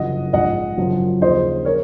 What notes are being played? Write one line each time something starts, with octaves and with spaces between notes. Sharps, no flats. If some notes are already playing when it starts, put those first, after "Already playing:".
Already playing: F#1 F#2 F3 D#5 F#5
A#1 G#2 F3 D#5 F#5
F#1 F#2 F3
D#2 C#3 F3 C5 D#5
A#4 C#5